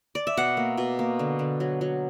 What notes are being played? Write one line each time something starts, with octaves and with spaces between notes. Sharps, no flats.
D5
E5
B2 F#5
A#3
B2
A#3
D3
D3
F#3
F#3